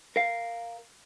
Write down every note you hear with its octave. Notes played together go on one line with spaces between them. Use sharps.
A#4 F5